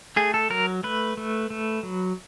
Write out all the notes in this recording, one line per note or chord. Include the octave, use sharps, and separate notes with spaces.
A3 G#4
A4
F#3 A#4
A3 B4
A3
A3
F#3